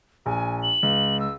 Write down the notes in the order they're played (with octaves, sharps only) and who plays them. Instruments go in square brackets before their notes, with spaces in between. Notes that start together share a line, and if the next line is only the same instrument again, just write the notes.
[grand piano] A#1 [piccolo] G#5
[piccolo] F#7
[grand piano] C#2
[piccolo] E6